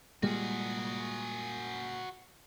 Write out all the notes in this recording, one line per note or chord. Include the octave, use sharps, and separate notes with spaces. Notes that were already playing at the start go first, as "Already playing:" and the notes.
A#2 G3 G#3 F#4 G#4